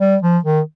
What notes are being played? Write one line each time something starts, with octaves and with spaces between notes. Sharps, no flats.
G3
F3
D#3